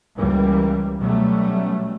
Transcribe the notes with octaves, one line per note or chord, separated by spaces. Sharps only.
C#2 E3 G3 A#3
B2 F#3 G3 A3 C#4